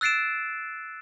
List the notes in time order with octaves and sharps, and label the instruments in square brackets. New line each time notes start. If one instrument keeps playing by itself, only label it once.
[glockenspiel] E6 F#6 A6 C7 D7 E7